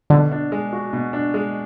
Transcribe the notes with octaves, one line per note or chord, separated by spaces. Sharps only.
B2 D3
D4
G#3
F#4
B2
D4
G#3